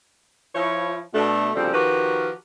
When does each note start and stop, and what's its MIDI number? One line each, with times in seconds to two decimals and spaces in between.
0.55 0.98 53
0.55 0.98 64
0.55 0.98 73
1.14 1.50 47
1.14 1.50 57
1.14 1.50 62
1.55 1.71 38
1.55 1.71 49
1.55 1.71 53
1.55 1.71 55
1.55 1.71 60
1.55 1.71 69
1.73 2.30 51
1.73 2.30 53
1.73 2.30 66
1.73 2.30 67
1.73 2.30 70
1.73 2.30 71